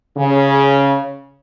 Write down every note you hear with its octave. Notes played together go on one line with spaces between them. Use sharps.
C#3